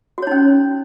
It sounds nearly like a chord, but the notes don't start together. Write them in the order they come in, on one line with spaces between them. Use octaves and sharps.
F#4 C#5 D#4 C#4